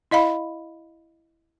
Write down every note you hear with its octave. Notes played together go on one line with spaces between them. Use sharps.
E4 D#5 F5 B5